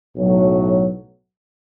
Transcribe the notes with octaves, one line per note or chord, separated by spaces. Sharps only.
B1 A2 F#3